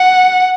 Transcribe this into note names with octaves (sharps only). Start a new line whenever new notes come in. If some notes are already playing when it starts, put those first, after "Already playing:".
Already playing: F#5